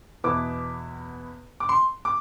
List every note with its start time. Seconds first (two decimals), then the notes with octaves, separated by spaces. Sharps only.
0.24 E2 B2 B3 E4 D6
1.60 D6
1.69 C6
2.05 D6